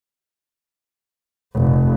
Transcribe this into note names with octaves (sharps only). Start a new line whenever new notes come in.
F1